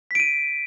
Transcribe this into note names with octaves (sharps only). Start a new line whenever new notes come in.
B6 D7 D#7